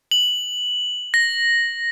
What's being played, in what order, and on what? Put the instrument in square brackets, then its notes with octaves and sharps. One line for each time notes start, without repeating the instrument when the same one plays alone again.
[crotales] F#7
A#6